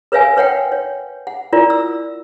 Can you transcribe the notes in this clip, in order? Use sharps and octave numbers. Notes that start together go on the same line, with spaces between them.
A#4 B4 C#5 E5 F5 G#5
B4 C#5 F#5 G5
C#5
F#5
E4 F4 A#4 D5
E6